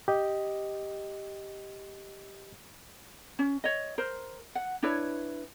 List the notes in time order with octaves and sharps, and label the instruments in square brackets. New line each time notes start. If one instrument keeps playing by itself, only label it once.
[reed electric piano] G4 D#5
[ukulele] C#4
C#5 D#5
A#4 C5
F#5
D4 E4 B4 C#5